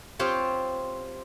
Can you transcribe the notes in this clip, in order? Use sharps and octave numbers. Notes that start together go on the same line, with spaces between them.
C4 F4 G4 C#5